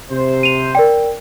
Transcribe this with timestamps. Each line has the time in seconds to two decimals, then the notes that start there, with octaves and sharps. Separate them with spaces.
0.11 C3 C5
0.43 D#7 F7
0.75 A#4 D5 G5